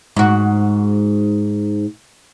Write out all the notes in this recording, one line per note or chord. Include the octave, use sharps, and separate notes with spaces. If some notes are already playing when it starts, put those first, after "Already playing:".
G#2 F#4